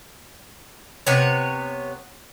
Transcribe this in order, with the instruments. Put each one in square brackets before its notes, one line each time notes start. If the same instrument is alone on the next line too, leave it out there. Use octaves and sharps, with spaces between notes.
[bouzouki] C3 B3 C#5